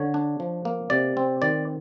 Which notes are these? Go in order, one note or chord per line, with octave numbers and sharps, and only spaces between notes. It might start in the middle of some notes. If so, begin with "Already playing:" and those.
Already playing: D3 C#5
D4
F3
A#3
C3 D5
C4
D#3 D5